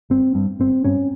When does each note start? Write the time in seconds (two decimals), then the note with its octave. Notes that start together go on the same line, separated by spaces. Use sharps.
0.10 G1 C4
0.35 G2
0.59 G1 C4
0.84 G2 C#4